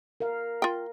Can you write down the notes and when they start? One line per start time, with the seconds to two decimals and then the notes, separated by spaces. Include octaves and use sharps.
0.20 A#4 F5
0.62 F4 G5